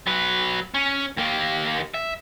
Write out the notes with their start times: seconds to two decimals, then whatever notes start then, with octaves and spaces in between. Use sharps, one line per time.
0.07 F#3 B4
0.74 C#4
1.17 D#2 A#3
1.94 E5